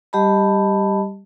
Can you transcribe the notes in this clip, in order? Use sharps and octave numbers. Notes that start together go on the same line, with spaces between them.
G3 G4 D#5 A5 B5